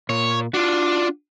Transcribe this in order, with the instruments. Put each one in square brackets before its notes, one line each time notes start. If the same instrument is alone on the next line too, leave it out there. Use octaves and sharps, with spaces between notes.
[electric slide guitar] A#2 [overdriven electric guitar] C#5
[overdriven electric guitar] D4 [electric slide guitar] F4 F#4